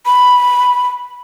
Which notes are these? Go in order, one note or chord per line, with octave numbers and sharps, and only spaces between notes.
B5